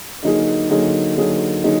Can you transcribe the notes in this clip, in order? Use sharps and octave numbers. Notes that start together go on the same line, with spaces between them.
D3 F#3 A#3 D#4 G#4
D3 F#3 A#3 D#4 G#4
D3 F#3 A#3 D#4 G#4
D3 F#3 A#3 D#4 G#4